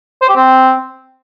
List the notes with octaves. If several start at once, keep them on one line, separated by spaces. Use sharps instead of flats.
C5
G4
C4